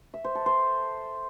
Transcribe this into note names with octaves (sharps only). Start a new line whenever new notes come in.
E5
C5
A4
C5